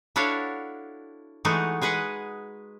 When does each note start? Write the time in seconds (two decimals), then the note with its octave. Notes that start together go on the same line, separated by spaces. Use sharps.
0.16 D4 E4 F#4 A4 C#5 F5
1.45 E3 G#3 A3 D#4 F#4
1.82 G#3 G#4 B4 D#5 F#5